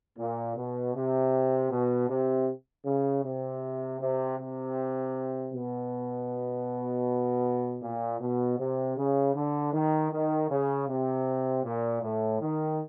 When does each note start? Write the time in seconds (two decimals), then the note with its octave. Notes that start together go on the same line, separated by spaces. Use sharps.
0.18 A#2
0.56 B2
0.95 C3
1.71 B2
2.10 C3
2.86 C#3
3.24 C3
4.01 C3
4.39 C3
5.53 B2
7.82 A#2
8.21 B2
8.59 C3
8.97 C#3
9.35 D3
9.74 D#3
10.12 D#3
10.50 C#3
10.88 C3
11.64 A#2
12.02 A2
12.41 D#3